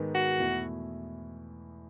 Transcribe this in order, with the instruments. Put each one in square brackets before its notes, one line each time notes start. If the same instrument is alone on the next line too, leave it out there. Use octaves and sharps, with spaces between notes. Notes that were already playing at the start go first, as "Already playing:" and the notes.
Already playing: [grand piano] G#2 D#3 G#3 B3 D#4
[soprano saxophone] F#4
[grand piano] E2 B2 A3 E4